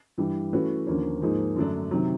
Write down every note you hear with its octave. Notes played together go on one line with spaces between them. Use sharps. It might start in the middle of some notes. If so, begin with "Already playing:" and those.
G2 E3 G3
E3 A3 C#4 F#4 B4
D#2 D3 F3 A#3 C#4
G#2 F3 A#3 D#4 G#4
F#2 D3 F#3 A3 D4
C3 D#3 F#3